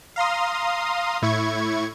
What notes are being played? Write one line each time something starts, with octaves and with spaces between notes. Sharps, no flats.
F5 A#5 C6 D#6
A2 E4 C#6 G#6